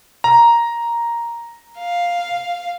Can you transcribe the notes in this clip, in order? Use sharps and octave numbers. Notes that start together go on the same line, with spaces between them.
A#5
F5